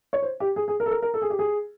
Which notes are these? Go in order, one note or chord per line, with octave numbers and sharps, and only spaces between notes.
C#5
C5
G4
G#4
G#4
A#4
A4
A#4
A#4
A4
G#4
G4
G#4